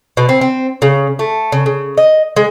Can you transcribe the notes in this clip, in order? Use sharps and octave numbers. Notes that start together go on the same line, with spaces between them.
B2
C4
C4
C#3
A3
C#3
C#3
D#5
G#3